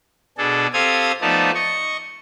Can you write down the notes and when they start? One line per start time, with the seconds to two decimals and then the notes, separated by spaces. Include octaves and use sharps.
0.38 B2 D4 G#4 A4
0.73 C4 G4 A4 F5 D#6 G#6
1.21 F3 A3 B3 D#4 D5 A5
1.55 D#5 C#6